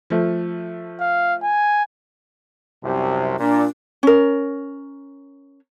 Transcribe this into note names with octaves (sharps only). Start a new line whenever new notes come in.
F3 A3
F5
G#5
C2 F#2 C3
A#2 D4
C#4 A#4